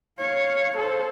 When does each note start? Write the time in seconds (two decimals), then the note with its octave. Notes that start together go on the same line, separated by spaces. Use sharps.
0.19 C#5 F5
0.77 A4 C5